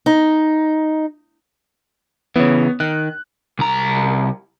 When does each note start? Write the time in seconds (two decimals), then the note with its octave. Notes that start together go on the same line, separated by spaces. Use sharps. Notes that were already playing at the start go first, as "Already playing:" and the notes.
0.06 D#4
2.36 C#3 E3 B3 C#5
2.80 D#3 F#6
3.59 C2 A#5